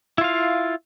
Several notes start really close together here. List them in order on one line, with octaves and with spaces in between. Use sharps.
E4 F4 F5